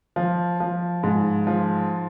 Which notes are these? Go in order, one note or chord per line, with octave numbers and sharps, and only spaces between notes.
F3
F3
G#2
F3